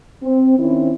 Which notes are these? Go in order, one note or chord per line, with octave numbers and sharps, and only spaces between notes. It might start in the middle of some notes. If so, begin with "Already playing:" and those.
C4
D#3 C4 C#4 E4